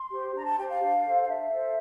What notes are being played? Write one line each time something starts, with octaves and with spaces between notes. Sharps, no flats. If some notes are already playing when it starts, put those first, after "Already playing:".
Already playing: C6
G4 C5
D4 A#5
A5
G4 C5 G5
F5
D4
A4 C5
F5
D4 E5
A4 C5